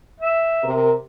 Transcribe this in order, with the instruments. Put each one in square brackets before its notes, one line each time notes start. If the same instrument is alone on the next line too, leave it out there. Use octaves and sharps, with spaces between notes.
[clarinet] E5
[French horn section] C3 A#4